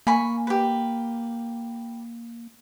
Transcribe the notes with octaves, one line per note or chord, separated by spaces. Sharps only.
A#3 G#5 B5 C#6
G4 B4